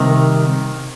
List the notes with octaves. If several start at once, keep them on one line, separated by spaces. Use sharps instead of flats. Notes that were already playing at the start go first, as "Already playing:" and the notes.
Already playing: C2 C3 D#3